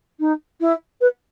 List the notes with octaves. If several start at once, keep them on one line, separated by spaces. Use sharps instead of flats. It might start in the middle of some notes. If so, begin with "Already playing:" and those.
D#4
E4
B4